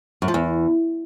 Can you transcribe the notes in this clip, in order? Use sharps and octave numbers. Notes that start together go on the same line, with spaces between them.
F#2
F3
E2